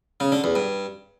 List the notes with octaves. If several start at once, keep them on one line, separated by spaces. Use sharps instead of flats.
C#3
D3
E2
G2